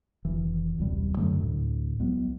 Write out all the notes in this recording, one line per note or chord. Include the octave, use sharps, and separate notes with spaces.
F1 D#3 E3
D#1 B1 C3 G3
F#2 D3 F#3 A3
D2 A2
C2 F#3 G#3 B3